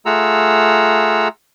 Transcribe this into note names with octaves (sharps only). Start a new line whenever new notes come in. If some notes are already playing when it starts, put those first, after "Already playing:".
A3 F4 G#4 F#5 A#5 E6